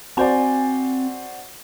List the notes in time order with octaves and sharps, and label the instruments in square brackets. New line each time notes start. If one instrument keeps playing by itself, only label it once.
[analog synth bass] C4 [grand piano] F#4 C5 D5 [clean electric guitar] G#5